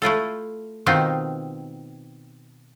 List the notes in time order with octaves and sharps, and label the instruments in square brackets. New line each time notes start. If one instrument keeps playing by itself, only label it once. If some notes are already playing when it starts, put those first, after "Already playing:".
[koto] A3 E4 F4 A4
B2 D#3 C4 D#4 F4